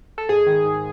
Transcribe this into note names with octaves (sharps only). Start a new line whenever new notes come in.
A4
G#2 G#4
D#3
G#2